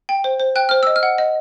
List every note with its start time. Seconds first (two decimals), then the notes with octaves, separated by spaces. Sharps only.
0.09 G5
0.24 C5
0.40 C5
0.56 G5 F#6
0.69 C5 F6
0.83 D#5 E6
0.96 F6
1.03 F#5
1.18 D#5